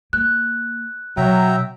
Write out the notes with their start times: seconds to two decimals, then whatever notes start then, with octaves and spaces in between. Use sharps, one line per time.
0.13 A#3 F#6
1.17 B2 F#3 E5 G5 A#5